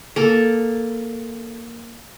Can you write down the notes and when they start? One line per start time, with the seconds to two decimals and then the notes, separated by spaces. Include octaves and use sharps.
0.16 A#3 A4